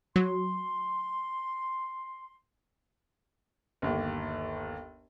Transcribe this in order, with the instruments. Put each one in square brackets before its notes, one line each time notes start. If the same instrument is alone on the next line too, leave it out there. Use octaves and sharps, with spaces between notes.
[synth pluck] F#3 [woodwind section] C6
[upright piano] G1 D#2